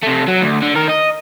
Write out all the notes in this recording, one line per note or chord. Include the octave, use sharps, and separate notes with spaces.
C3 A3
F#3
D2
D3
D#3 A#4
D#5